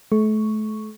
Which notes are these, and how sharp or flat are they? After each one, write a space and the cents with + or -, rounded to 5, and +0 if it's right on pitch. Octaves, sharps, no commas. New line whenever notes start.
A3 -35 C#6 +0